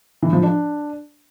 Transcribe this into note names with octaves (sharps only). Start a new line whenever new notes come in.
E3
F3
D4